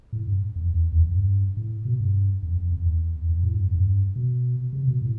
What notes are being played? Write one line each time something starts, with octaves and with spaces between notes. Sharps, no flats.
A2
G2
F2
E2
E2
F2
G2
A2
B2
G2
F2
F2
F2
E2
F2
A2
G2
F2
G2
B2
C3
B2
A2